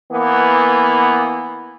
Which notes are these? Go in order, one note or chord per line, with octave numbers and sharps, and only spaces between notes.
E3 A#3 B3